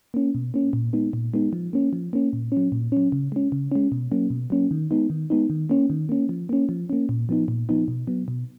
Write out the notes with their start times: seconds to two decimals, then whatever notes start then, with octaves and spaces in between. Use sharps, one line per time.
0.14 A#3 C#4
0.35 B2
0.54 A#3 C#4
0.73 A#2
0.93 G#3 B3 D#4
1.13 A#2
1.34 G#3 B3 D#4
1.53 F3
1.73 A#3 C#4
1.93 F3
2.13 A#3 C#4
2.33 A#2
2.52 F#3 C#4
2.72 A#2
2.92 F#3 C#4
3.12 C#3
3.32 G#3 C#4
3.52 C#3
3.72 G#3 C#4
3.92 B2
4.12 F#3 A#3 C#4
4.30 B2
4.50 F#3 A#3 C#4
4.71 D#3
4.91 G#3 B3 D#4
5.10 D#3
5.30 G#3 B3 D#4
5.50 D#3
5.69 A#3 C#4
5.90 D#3
6.09 A#3 C#4
6.29 F3
6.49 A#3 C#4
6.69 F3
6.90 A#3 C#4
7.09 A#2
7.29 F3 B3 D#4
7.48 A#2
7.69 F3 B3 D#4
7.88 B2
8.07 F#3 B3
8.28 B2